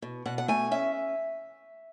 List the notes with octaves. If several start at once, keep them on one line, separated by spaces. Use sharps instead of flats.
B2
B2 F#5
F#5
A3 G#5
C#4 E5